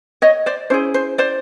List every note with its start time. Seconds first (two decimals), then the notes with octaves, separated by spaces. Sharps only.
0.22 C#5 D#5
0.46 C5 D5
0.70 C#4 E4 G#4 C5
0.94 C5
1.18 C5 D5